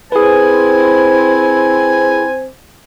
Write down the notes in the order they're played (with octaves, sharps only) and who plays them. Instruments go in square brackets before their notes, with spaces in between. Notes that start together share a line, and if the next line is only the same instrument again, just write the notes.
[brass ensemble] C4 C5 [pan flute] E4 [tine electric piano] G#4 B4 [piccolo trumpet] G#5